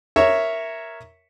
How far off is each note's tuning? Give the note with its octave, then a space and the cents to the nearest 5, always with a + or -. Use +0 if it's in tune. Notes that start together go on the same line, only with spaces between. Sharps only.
A#4 +0 C#5 +0 E5 +0